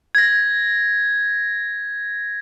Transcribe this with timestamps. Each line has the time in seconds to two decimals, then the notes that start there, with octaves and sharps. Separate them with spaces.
0.15 G#6 A#6